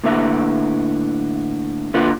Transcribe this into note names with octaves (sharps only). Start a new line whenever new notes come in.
A2 D3 A#3 B4 E5
D3 A#3 F4 B4